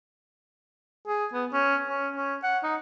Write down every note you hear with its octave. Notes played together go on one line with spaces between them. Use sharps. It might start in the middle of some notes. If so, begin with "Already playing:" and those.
G#4
B3
C#4
C#4
C#4
F#5
D#4